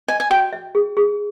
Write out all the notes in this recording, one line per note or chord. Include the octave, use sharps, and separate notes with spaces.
D#5 G#5
G#5
F#4 G5
E5
G#4
G#4